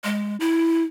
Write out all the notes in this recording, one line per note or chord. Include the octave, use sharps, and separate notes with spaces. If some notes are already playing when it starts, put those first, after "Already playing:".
G#3
E4